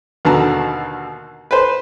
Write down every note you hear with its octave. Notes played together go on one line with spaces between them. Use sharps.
D#2 B2 D3 A5 A#5
B4 C5